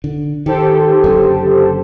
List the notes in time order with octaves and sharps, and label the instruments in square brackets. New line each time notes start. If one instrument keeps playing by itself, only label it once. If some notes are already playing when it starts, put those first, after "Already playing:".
[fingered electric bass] D3
[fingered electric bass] D#3 [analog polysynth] G4 A4 C5
[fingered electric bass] F#1 F#2 D3